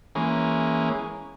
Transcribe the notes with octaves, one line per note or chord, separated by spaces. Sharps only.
E3 G#3 A#3 C#4